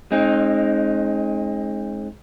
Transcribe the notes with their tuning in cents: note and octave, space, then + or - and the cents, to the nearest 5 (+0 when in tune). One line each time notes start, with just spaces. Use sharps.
G#3 +25 C4 +45 D#4 +0